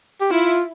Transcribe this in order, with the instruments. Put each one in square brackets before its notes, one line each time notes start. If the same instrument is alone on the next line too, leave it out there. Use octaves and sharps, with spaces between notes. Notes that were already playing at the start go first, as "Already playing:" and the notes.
[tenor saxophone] G4
[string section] E4 [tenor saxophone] F4